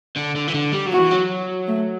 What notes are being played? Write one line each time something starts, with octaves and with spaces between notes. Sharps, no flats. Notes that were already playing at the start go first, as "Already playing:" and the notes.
D3
D3
E3
D3
G3
F#3
F#4
E3
F#3
A3